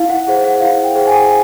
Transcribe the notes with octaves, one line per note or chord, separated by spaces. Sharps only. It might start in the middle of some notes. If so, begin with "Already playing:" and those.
Already playing: E4 F5
F#5
G#4 C5 F#5
F#5
E4 F5
G5
G#4 C5 G5
G#5